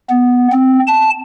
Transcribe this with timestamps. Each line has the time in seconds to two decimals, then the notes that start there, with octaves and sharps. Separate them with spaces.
0.10 B3
0.52 C4
0.87 A5